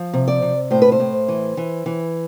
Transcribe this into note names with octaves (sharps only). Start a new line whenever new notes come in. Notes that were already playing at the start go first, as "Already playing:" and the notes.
Already playing: F3
C3
D5
C3
A2 C5
B4
C5
A2
E3
E3
E3